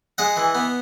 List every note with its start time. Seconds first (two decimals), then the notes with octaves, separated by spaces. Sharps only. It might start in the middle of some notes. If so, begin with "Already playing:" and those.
0.18 G#3 D#5 F#5
0.37 E3
0.55 B3